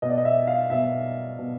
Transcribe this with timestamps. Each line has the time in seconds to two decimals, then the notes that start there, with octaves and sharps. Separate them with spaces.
0.02 B2 D#5
0.09 D5
0.18 D#5
0.25 E5
0.47 F5
0.70 B2 E5
1.39 B2